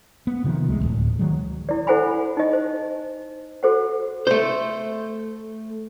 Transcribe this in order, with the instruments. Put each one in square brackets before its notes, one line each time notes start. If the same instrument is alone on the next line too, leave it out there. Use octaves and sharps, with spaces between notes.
[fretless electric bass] B3
C3 D#3 F3
C#2 G#3 A3
D1 C2
D#3 F#3 G#3
[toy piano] E4 D5
E4 A4 C5 F#5 G#5 B5
D#4 D#5
C5
F#4 A4 C5 F#5
[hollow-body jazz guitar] A3 C5